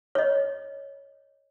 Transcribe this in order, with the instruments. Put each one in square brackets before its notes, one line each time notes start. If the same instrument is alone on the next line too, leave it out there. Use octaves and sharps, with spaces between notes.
[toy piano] C#5 D#5